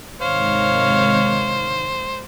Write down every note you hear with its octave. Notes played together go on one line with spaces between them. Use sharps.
G#2 C3 D#3 C5 C#5 F5